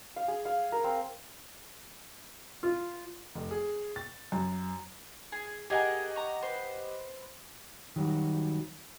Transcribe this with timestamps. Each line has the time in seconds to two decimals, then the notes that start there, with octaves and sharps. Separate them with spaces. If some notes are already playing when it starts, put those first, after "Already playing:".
0.16 F5
0.28 G#4
0.45 F5
0.72 A#4
0.84 C4
2.63 F4
3.35 F1
3.51 G#4
3.96 A6
4.32 F#2
5.32 G#4
5.70 G4 G#4 A#4 D#5 F#5 G#5
6.16 C#5 A#5
6.42 B4 C5
7.96 D#3 F#3 G3 F#4